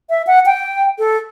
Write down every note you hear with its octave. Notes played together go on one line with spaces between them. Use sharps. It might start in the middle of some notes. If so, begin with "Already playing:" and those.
E5
F#5
G5
A4